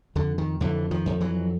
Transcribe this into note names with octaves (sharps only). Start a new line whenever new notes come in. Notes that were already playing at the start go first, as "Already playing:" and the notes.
F2 D3
D#3
F2 D3 E3
D#3 F3
F2
E3 F#3